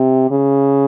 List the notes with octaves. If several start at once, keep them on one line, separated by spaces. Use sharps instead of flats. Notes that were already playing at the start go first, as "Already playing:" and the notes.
Already playing: C3
C#3